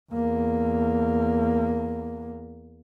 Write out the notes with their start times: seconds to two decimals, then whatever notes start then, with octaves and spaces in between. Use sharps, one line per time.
0.12 E2 A#3